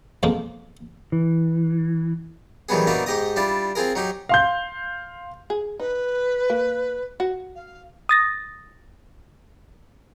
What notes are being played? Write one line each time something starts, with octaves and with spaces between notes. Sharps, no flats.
F2 B2 F3 G#3 A#3
E3
D#3 E3 F#3 G3 B3 G#4
F#3 A#3 B3 D4 D#4 E5
G#2 G4 D#5 A#5 D#6
G3 D4 E4 F4 D5
C4 F4 G#4 A#4
F#3 D#4 G4
F5 C6 G6
G#4
D#4 B4
A#3
F#4
F5
D#6 A6 A#6